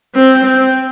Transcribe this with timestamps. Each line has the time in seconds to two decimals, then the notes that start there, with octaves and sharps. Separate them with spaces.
0.15 C4
0.45 C4